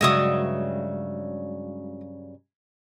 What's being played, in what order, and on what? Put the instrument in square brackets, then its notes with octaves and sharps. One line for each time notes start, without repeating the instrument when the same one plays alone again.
[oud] G2 C#3 F#3 [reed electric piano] G#3 F#4 [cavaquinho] D#5 E5 D#6